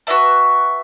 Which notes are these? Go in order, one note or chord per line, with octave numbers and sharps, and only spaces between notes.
F#4 B4 E5 A5